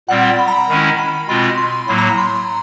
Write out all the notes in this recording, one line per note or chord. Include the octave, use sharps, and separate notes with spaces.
A#2 G3 C4 F#5
B5
A#5
B5
D#3 G#3 C#4 E4
B5
B2 G#3 C4 F4 B5
C6
C6
A2 F#3 A#3 B5
A#5
B5
C6